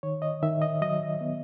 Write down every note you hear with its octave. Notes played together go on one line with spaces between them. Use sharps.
D#3 C#5
D#5
D#3 E5
D#5
F#3 D#5
B3